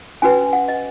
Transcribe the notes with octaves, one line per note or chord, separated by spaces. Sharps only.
C#4 F#4 B4 G#5
F#5
D#5